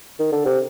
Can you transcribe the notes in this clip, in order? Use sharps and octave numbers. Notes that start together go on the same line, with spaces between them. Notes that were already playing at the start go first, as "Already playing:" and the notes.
D#3
D3
C3